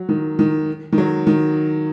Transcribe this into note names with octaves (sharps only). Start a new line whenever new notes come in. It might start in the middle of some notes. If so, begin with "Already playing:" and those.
Already playing: F#3
D#3
D#3
D#3
F#3
D#3